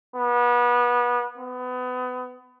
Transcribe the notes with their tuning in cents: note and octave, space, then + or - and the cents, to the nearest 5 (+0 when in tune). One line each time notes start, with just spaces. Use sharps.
B3 -30
B3 +30